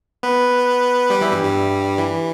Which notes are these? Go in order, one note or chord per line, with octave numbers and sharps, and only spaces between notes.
B3 B4
G3 G4
E3 E4
G2 G3
G2 G3
E3